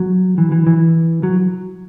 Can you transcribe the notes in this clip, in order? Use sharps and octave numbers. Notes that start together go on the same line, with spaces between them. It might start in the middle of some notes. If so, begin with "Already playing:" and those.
Already playing: F#3
E3
E3
E3
F#3